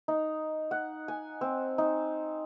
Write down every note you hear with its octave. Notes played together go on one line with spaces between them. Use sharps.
D#4
F#5
G#5
C4
D#4